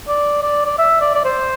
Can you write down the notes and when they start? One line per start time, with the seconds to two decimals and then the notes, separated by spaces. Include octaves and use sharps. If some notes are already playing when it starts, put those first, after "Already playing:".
0.08 D5
0.42 D5
0.65 D5
0.78 E5
1.01 D5
1.15 D5
1.25 C5